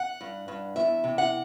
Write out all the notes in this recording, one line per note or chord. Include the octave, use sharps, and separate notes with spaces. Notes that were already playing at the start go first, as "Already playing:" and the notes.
Already playing: F#5
G2
G2
E2 E5
C3
F#5